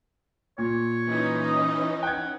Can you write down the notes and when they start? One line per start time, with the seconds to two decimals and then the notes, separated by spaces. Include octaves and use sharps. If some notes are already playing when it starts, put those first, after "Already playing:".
0.58 A#2 C#5
1.06 E3 C#4 D#4
1.45 D#5
2.03 F#5 G5 G#6